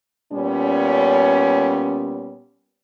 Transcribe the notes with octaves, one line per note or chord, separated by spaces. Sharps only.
A#2 G3 B3 C#4